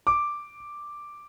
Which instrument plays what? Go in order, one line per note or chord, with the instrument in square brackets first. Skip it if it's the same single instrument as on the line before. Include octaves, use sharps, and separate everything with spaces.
[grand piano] D6